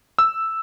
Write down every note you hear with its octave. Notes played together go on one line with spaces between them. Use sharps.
E6